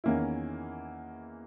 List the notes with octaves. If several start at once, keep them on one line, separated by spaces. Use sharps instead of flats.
E2 D#3 A#3 C#4 E4